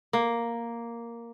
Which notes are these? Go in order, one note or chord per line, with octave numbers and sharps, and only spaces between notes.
A#3